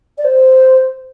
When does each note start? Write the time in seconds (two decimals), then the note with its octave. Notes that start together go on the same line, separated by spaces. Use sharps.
0.17 D5
0.24 C5